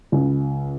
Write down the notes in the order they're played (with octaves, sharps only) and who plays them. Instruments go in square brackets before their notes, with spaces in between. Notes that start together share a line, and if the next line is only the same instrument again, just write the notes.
[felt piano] C#2